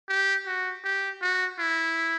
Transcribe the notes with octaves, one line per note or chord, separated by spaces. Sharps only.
G4
F#4
G4
F#4
E4